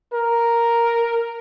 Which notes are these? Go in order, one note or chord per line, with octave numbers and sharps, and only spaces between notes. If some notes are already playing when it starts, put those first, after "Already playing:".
A#4